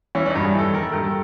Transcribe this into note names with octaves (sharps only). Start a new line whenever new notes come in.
E3 C#4
D4
D#4
G2
G#4
E3 A4
D#3 A#4
A4
G2 A#4
A4